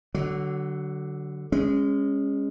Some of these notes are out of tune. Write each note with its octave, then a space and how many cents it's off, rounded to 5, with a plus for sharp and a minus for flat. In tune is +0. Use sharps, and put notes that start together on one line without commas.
D3 +0 F#3 +25
G#3 -20 C#4 +0